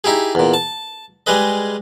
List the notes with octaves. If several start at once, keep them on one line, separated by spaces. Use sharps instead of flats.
D#4 E4 G4 G#4
E2 A#2
A5
G3 G#3 G#4 B4 D#5